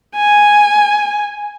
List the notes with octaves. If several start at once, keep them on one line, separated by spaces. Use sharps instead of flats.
G#5